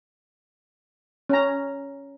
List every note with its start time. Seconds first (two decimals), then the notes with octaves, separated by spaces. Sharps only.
1.29 C#4 A#5